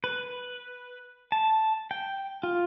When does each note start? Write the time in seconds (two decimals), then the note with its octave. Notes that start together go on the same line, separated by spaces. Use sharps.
0.04 B4
1.32 A5
1.91 G5
2.43 F4